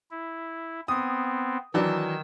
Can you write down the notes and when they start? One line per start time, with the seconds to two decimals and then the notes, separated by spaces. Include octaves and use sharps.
0.11 E4
0.88 B3 C4 D#6
1.74 D#3 E3 F#3 D4 E6